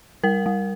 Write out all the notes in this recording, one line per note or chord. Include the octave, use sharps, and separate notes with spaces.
G3 A#4
G3